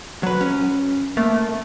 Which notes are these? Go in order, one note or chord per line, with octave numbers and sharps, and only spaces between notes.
F#3 B4
C#4
A3 A#3